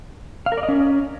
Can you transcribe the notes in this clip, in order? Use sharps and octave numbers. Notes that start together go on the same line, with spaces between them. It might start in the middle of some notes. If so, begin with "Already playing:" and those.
F5
A#4
D5
D#5
C#4